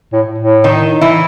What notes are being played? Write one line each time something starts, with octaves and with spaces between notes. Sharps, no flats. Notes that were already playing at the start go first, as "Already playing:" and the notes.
A2
A2
D#3 D#4
E3 E4